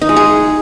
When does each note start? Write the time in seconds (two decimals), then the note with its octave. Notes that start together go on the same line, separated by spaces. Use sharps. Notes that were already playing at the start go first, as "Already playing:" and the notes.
0.02 D#4
0.09 G#3
0.16 G#4